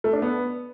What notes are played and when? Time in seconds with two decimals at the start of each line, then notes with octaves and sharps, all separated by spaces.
0.04 A3
0.13 D4
0.22 B3